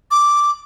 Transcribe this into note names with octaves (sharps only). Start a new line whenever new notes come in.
D6